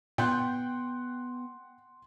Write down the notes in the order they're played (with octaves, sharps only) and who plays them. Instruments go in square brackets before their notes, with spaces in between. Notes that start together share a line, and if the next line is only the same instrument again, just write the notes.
[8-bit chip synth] A#2 [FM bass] B3 [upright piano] F#5 C6 F#6 [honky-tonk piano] G5 G6